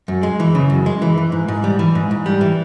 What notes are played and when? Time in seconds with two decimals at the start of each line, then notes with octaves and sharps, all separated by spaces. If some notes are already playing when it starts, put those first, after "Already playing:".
0.08 F#2
0.23 G#3
0.40 E3
0.55 C#3
0.70 F#2
0.86 G#3
1.02 E3
1.18 E3
1.32 G#2
1.48 G#2
1.64 G3
1.79 E3
1.95 G#2
2.11 G#2
2.26 G3
2.41 E3